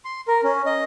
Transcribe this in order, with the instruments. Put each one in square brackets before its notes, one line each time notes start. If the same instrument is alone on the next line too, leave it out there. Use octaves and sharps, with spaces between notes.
[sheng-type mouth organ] C6
A#4
C#4
D#5